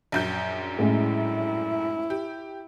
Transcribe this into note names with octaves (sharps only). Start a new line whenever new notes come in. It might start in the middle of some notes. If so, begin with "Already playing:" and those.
A#1 F#2 G6
A2 G#3 C#4 E4
G4